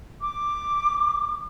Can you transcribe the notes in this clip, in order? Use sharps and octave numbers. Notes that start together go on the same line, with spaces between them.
D6